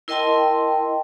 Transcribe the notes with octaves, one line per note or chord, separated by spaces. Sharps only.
E4 A#4 D#5 G5 A5 C6